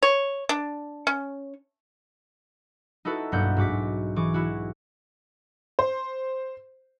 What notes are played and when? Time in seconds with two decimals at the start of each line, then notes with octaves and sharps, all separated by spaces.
0.03 C#5
0.49 D4
1.07 C#4
3.05 D#4 E4 F#4 A4 B4
3.32 B1 G2 A#3 G4 F#5 G6
3.57 G#2 F#4 D6 B6
4.16 E3 G#4 C#6 D6
4.34 E4 F#4
5.79 C5